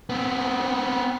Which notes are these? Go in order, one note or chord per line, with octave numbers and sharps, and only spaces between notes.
B3 C4